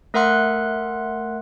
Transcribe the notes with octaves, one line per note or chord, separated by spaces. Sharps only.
A3 A#4 E5 F#5 C6 F#6